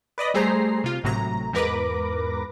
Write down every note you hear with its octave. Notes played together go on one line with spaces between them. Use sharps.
B4 D5 D#5 B5
G3 A3 G#4 C5 A#5 C7
C3 F4
G#1 A2 C3 F#3 A#5
E2 G#2 A#4 B4 D6 A#6